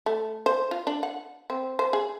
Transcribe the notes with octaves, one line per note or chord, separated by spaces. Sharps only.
A3
C5
F4
D4
F#5
C4
C5
G#4